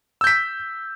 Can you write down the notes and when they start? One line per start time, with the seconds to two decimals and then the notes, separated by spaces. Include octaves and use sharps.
0.21 E6
0.24 G6
0.27 B6